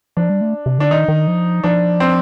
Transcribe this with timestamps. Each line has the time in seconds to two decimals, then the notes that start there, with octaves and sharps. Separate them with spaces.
0.17 F3 D4
0.30 G3
0.41 A3
0.66 C3
0.78 D3 D4
0.91 D#3 D#4
1.08 D#3
1.27 F3
1.63 F3 D4
2.00 C4